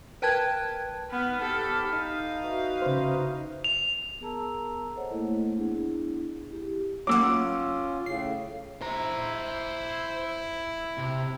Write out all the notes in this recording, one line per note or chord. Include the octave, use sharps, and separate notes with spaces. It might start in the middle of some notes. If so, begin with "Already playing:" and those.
A#4 B4 G5 A5 F#6 G#6
G#2 B3 B5 F6
G4 A4
D#4 F5
F#4 B4 E5
C#3 C5
F7
B3 G#4 A#4 A5 A#5 E6
A4 C5 C#5 D#5 F#5
A3 A#3 E4 F#5
B3 D4 E4 G#4
E4 G4
F#3 A#3 C#4 F4 F#5 D6 E6
A2 C#3 C7
E4 C5 A#5
C3